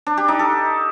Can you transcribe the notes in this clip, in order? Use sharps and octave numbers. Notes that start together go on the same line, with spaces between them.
D4
G4
D#4
A4